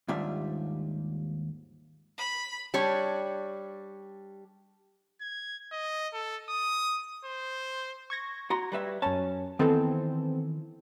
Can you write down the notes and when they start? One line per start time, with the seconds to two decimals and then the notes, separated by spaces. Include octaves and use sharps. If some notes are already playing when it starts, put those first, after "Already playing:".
0.08 D#2 G#2 G3 D4 F4 E5
2.18 B5
2.74 G3 D4 C#5
5.21 G#6
5.72 D#5
6.13 A4
6.49 D#6
7.25 C5
8.10 C#6 G#6 A#6
8.50 F#4 A#5 C6
8.72 G3 B4 E5
9.02 F#2 C#4 A5
9.59 D#3 E3 B3 C4 A4